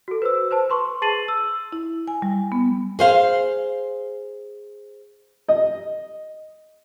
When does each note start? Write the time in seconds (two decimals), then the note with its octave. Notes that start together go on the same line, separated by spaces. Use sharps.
0.08 F#4 A4
0.22 B4 C5 E6
0.51 B4 C5 A5
0.70 B4 C6 C#6
1.02 G#4 A5 A6 C7 D#7 F#7
1.28 E6
1.72 E4
2.08 G#5
2.22 G3
2.52 B3
2.99 G#4 C5 F5
5.48 D#5